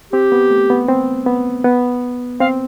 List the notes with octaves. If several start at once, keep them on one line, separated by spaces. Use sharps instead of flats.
C4 G4
B3
A3
B3
C4
B3
B3
C4 F5